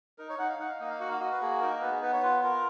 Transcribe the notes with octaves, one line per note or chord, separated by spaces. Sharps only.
D#4 A#4
C#5
D#4 F#5
F5
D#4 F#5
F5
A#3 D#5
F5
F#4 F#5
F5
F#4 D#5
B4
A#3 G#4
D#4 A#4
B3 B4
G#4
B3 B4
C#5
F4 B4
F4 A#4